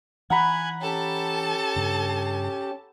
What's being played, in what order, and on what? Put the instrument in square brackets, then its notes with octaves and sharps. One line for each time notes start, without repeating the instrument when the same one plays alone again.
[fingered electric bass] E3 [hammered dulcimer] F#5 A#5 B5 [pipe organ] G#5 F#6 G#6
[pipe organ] C#4 G4 [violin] A4 A5
[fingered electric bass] G2 C#3